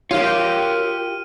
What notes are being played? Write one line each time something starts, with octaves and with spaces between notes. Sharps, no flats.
F4 G4 A#4 C#5 F6 D#7